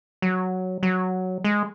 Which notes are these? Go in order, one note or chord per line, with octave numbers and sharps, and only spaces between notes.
F#3
F#3
G#3